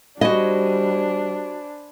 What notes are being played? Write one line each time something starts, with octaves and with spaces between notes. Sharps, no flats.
G3 D4 F#4 C5 D#5 G#5 B5